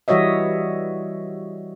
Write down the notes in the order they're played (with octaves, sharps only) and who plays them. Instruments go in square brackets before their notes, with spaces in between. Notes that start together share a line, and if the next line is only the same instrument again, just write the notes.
[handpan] E3 G3 F#4 C#5 D#5 E5